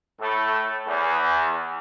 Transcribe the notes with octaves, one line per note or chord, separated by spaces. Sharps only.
A2 A3
E2